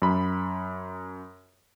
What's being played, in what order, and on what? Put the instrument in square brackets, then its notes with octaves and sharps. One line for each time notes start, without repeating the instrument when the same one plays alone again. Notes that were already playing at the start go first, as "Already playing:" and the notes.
[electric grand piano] F#2 B5